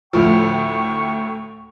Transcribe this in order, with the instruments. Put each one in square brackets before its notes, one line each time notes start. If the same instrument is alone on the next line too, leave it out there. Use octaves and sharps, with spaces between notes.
[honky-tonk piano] D2 A2 F3 [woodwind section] G5 C#6